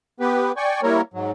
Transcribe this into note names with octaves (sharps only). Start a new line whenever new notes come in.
B3 G4 B4
D5 G5 G#5 C#6
G3 A#3 E4 A#4 C#5
G#2 F#3